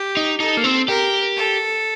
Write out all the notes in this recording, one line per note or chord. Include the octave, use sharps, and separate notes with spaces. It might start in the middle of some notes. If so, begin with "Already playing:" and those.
Already playing: G4
D#4
D#4 A4
A#3
C4
G4 A#4
A4